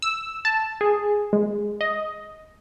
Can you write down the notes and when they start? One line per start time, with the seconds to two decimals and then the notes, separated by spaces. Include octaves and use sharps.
0.02 E6
0.45 A5
0.81 G#4
1.33 G#3
1.81 D#5